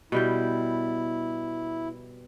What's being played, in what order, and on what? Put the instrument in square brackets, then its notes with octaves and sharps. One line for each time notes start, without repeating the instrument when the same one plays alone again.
[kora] B2 G3 G5 [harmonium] E4